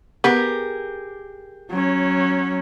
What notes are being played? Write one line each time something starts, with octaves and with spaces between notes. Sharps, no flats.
B3 G4 G#4 A#4
F#3 C#4